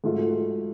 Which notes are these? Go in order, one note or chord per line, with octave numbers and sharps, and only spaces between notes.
G#2 F#3 A3 F4